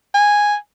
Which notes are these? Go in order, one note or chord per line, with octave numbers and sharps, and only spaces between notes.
G#5